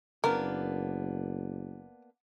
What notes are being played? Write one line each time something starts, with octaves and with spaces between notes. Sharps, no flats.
F#1 A#3 B3 D4 A#4